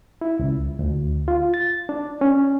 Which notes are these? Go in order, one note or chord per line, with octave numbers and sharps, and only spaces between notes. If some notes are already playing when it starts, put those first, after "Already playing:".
E4
C#2
D2
F4
A6
D4
C#4